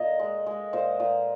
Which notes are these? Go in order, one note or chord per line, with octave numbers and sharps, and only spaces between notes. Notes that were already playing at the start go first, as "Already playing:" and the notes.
Already playing: A#2 D#5
G#3
G#3
A#2 C5
A#2